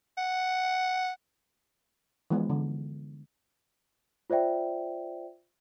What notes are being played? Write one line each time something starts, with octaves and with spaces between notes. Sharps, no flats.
F#5
E3 F3 G#3 B3 F4
D3
F4 C5 D5 E5 G5